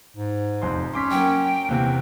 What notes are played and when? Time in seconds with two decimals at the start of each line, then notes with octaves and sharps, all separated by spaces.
0.16 G#2
0.62 F1 F2 C6
0.94 C#4 C6 D6 B6
1.11 F#3 A#3 G5
1.68 E2 C3 A#3